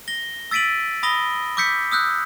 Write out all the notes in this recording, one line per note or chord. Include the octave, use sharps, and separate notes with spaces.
A#6 G7
E6 A6 B6 D7 D#7 F#7
B5 D#6 A#6 G7
D6 E6 G6 B6 C#7
D#6 E6 F#6 G6